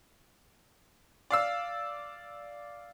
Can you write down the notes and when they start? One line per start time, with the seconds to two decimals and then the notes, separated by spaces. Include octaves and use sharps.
1.31 D5 F5 E6